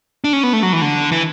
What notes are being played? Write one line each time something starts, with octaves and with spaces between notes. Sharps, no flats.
D4
C#4
B3
A3
F#3
E3
D3
E3